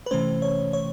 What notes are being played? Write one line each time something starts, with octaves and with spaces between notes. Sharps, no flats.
B4
C3 E3 A3 C#4 C5
C#5
C#5